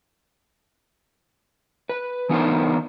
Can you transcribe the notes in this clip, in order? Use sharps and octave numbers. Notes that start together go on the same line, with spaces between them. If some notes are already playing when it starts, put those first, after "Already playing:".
B4
E3 B3 D4 D#4 A#4 C5